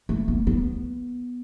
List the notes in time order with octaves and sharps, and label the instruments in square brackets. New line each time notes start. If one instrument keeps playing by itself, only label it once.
[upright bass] A3
B3
B3